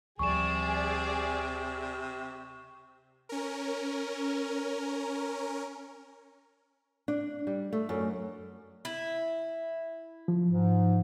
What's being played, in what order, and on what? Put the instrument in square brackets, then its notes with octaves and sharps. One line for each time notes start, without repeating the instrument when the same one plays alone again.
[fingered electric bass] D2 F3 G3 [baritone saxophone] C3 [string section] G#4 D5 [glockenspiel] C#6 E7
[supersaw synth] C#4 A#4
[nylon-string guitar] D4
G3
A3
F#2
[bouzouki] E4
[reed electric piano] F3
[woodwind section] G#2